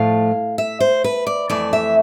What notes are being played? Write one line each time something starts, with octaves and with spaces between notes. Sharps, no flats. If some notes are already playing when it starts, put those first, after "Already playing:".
Already playing: A2 F3 A3 F5
E5
C5
B4
D5
F2 E3 A3 D5
E5